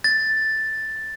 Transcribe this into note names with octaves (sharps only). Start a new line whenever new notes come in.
A6